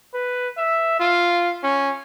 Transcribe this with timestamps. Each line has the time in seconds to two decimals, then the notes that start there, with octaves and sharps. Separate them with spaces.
0.14 B4
0.57 E5
1.00 F4
1.63 C#4